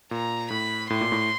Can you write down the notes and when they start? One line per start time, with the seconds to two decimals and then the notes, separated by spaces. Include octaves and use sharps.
0.11 A#2 A#5
0.50 A2 B5
0.90 A2 C6
1.01 A#2
1.12 A2